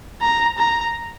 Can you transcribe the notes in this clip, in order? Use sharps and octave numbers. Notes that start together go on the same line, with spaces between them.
A#5
A#5